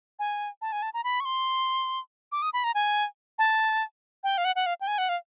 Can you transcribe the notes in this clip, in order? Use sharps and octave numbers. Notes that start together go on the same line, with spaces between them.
G#5
A5
G#5
A5
A#5
B5
C#6
C6
D6
D#6
B5
A#5
G#5
A5
G5
F5
F#5
F#5
F5
G5
G#5
F#5
F5